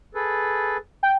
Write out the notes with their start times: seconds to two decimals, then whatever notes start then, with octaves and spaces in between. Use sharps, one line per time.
0.15 G#4 A4 B4
1.03 G5